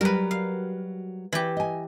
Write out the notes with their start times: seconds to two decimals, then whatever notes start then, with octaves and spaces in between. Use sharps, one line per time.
0.01 F#3 G3 F#4 A#4 B4
0.31 F5
1.33 E3 G4
1.57 D#5 G#5